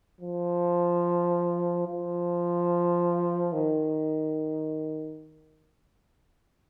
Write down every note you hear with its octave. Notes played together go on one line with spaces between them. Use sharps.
F3
F3
D#3